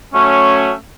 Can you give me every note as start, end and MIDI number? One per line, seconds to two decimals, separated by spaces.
0.14 0.73 54
0.14 0.73 57
0.14 0.73 61